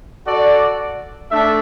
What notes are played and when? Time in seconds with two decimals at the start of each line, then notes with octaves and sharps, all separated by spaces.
0.26 F#4 A4 D5
1.31 A3 D4 A4 E5